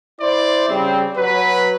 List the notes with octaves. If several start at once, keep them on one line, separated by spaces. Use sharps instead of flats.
E4 C5 D5
C#3 G3 C4
F#3 B4